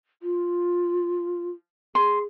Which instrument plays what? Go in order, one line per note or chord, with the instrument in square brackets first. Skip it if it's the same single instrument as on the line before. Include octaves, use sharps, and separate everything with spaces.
[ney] F4
[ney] G#4 [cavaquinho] C6